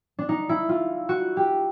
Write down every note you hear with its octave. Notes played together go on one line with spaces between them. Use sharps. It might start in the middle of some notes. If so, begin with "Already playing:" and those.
D4
D#4
E4
F4
F#4
G4